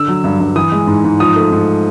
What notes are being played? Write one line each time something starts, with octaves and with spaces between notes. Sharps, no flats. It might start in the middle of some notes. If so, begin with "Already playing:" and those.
Already playing: D3 E6
F#3
G2
G2
E3 D#6
G#3
G#2
G#2
F3 D#6
A3
G#2